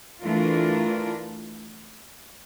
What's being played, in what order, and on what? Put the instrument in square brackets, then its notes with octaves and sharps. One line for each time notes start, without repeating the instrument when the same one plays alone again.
[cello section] E3 A3 D4 F4 A#4